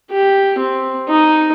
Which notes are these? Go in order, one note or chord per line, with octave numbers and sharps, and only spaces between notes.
G4
C4
D#4